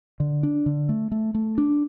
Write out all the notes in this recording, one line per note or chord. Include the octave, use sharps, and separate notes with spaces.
D3
D4
D3
A3
A3
A3
D4